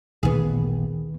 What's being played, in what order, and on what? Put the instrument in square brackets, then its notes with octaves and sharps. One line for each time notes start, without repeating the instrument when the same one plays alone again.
[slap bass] A1 A#2 A#3 [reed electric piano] D2 D#3 [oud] B3 G#4